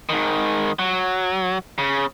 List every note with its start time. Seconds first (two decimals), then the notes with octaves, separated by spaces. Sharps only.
0.09 G#2 D#3
0.79 F#3
1.78 C#3